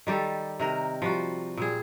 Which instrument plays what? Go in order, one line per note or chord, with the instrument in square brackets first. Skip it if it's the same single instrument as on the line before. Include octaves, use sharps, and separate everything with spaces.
[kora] D#3 G3 G4 A4
C3 D#3 A#4
F3 G3 F#4
A#2 G3 G#4